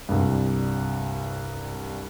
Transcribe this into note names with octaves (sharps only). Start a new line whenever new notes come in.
C2 G2